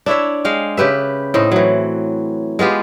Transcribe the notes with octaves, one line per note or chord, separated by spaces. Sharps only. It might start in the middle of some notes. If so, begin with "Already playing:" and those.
D4 E4 C#5 E5
G#3 F5 G5
C#3 G4 B4 E5
A2 C4 D#4
E3 F#3
G#3 B3 F4 G4